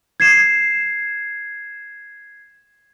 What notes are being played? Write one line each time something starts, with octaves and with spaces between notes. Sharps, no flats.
G#6 C7 E7